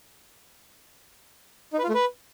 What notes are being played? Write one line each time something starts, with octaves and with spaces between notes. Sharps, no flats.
D#4
B4
F4
A3
B4